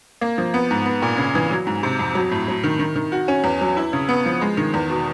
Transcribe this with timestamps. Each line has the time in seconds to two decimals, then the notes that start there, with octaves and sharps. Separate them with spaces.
0.21 A#3
0.38 F3
0.54 B3
0.71 G#2
0.86 B3
1.02 A#2
1.18 C#3
1.35 E3
1.51 F#3
1.67 G#2
1.83 C3
1.99 F2
2.15 F#3
2.31 A2
2.48 F#3
2.64 D#3
2.79 D#3
2.96 D#3
3.12 F#4
3.28 C#4
3.44 E2
3.61 F#3
3.77 E4
3.93 C#3
4.09 B3
4.26 F3
4.41 G#3
4.57 D#3
4.74 E2
4.90 B2